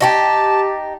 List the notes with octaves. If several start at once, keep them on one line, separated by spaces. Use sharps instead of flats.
D#4 F#4 G4 A5